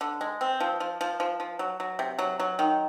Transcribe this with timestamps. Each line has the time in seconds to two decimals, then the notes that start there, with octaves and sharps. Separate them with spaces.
0.01 D3
0.21 G#3
0.41 C4
0.60 F3
0.80 F3
1.01 F3
1.20 F3
1.40 F3
1.59 F#3
1.80 F#3
1.99 C3
2.19 F#3
2.40 F#3
2.59 D#3